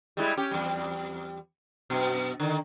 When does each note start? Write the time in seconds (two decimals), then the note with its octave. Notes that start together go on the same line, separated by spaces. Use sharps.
0.17 G3 G#3 E4
0.37 C#4 G4
0.51 E2 G3
1.90 F#2 B2
2.40 D3 D#3